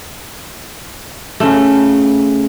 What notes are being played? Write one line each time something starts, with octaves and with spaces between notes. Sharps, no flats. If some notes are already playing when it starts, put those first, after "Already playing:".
C#3 A3